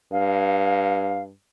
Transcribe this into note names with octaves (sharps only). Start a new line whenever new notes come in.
G2 F5